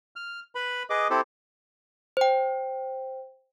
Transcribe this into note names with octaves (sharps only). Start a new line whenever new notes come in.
F6
B4 B5
G#4 B4 D#5 D6
C4 E4 G4 A4 C5
C5 G5